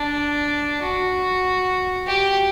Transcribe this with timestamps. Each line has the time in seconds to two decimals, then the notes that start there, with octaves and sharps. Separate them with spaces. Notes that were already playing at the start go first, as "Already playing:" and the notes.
Already playing: D4
0.82 F#4
2.07 G4